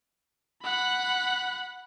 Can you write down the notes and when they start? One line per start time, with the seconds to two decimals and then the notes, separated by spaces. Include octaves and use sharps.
0.63 F#5 B5